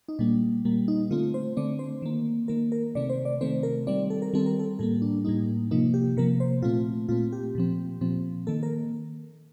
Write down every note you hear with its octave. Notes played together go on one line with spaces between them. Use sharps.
D#4
A#2 G3 A#3 D4
A#2 G3 A#3
D#4
D3 A3 C4 F4
C5
D3 A3 C4 D5
C5
D#3 A#3
D#3 A#3 A#4
A#4
C3 D#3 A3 C4 D5
C5
D5
C3 D#3 A3 C4 C5
A#4
D#3 G3 C4 D5
A4
A#4
D#3 G3 C4 A4
A#4
A4
A2 G3 A#3 A4
D4
A2 G3 A#3 D#4
C3 F3 A#3 D#4
G4
C3 F3 A#3 A#4
C5
A#2 A3 C4 F4
A#2 A3 C4 F4
G4
A#2 F3 C4
A#2 F3 C4
D#3 A#3 A4
A#4